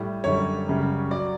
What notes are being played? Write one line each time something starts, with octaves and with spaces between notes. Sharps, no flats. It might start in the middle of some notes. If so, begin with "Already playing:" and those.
Already playing: A2 G3
F#2 D3 G3 C#5
F#2 C#3 G3
F#3 D5